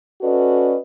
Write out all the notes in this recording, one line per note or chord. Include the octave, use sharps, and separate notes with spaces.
C#4 F#4 A4 B4 D5 D#5